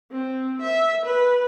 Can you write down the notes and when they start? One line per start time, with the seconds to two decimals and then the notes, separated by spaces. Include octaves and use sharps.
0.12 C4
0.62 E5
1.05 B4